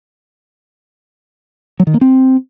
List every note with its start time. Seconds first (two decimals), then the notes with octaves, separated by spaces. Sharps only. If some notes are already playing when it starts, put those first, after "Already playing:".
1.80 F#3
1.87 D#3
1.94 A#3
2.01 C4